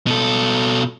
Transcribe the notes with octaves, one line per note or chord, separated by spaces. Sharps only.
B2 A4